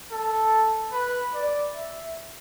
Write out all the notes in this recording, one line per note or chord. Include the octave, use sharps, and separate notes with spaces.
A4
B4
D5
E5